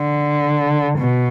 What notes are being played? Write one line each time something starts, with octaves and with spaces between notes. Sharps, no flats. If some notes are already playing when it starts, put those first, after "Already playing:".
Already playing: D3
B2